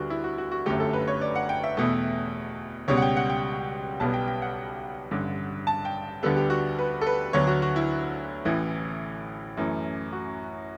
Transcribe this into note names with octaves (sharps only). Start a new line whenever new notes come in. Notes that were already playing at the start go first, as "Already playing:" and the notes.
Already playing: D2 D3 G3 B3 F#4
E4
F#4
F#4
F#4
G1 F#2 D3 A3 G4
A4
B4
C#5
D5
F#5
G5
E5
E2 B2 A3
C#2 B2 G3 C#5
F#5
G5
F#5
G5
B1 B2 G3 B3 A5
G5
G5
F#5
A1 G2 D3
A5
G5
D2 D3 G3 B3 A4
G4
F#4
B4
A4
B4
D2 D3 F#3 B3 C#5
F#4
F#4
E4
A1 A2 E3
F#2 E3 A3
F#4